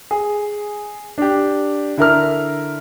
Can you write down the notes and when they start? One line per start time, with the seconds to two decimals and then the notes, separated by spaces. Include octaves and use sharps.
0.11 G#4
1.18 D4 G4
1.97 D3 E4 A#4 F6